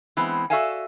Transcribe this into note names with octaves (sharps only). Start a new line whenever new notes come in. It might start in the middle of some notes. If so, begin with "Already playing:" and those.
E3 G#3 B3 C4
F#4 A4 D5 E5 F5 G#5